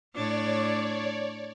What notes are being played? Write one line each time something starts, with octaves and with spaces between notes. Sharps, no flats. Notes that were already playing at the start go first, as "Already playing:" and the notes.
A2 D4 C#5 D5